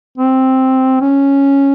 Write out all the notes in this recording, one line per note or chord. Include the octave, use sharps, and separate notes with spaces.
C4
C#4